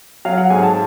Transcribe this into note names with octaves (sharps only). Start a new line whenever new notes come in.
F#3 F5
F#5
G#2 G#5
A5